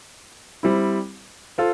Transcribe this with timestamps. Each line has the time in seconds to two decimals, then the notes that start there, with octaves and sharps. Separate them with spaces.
0.63 G3 C4 E4
1.58 F4 A4 C5